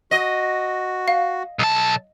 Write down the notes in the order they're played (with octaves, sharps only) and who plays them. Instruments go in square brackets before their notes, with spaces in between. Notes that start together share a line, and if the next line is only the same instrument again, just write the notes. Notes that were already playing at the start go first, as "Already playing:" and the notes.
[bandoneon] F#4 [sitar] D#5
[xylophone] F5
[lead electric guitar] B1 A5